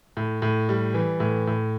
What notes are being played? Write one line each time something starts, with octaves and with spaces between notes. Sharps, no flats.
A2
A2
G3
E3
A2
A2